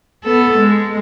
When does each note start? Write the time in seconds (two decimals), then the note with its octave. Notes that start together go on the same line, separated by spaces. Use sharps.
0.24 B3 A4
0.58 G#3